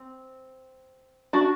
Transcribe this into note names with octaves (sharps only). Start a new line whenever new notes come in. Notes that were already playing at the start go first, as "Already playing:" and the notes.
Already playing: C4
D4 F#4